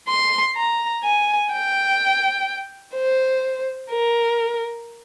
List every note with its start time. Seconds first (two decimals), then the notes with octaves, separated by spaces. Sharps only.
0.08 C6
0.56 A#5
1.04 G#5
1.52 G5
2.95 C5
3.91 A#4